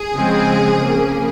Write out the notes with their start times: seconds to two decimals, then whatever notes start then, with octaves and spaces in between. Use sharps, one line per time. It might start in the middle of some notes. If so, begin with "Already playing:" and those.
Already playing: G#4
0.14 C#3 F3 G#3 C4
0.80 C#3 F3 A#3